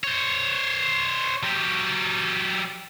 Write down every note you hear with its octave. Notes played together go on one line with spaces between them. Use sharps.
C5 C#5
F#3 G4